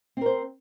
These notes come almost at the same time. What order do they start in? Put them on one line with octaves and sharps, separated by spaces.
C4 A#4 C5